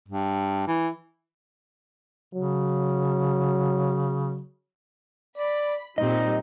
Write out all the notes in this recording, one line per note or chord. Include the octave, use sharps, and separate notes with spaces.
G2
E3
C#3 F#3
D5 B5
A#2 G3 C4 D#4 D#5